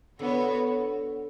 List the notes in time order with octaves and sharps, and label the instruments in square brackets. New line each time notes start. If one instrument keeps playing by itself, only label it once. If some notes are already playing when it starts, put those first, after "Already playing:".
[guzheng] D3 [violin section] B3 F#4 C#5